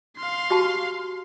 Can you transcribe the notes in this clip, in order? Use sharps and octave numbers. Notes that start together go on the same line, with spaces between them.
F5 C6
F#4 G4 A5